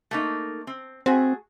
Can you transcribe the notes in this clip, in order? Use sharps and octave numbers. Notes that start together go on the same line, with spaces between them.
A3 A#3 D#4
C4
A3 C4 F#4 G#4